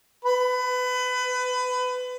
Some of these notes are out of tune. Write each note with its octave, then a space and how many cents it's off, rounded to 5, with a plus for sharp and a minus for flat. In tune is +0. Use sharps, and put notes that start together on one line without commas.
B4 +25